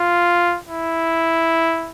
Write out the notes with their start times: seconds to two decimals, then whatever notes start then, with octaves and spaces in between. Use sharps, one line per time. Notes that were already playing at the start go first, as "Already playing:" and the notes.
Already playing: F4
0.66 E4